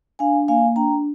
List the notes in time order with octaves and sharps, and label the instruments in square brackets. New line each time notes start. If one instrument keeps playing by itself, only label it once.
[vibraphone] D4 F5 G#5
A#3 F5 G#5
D4 G5 A#5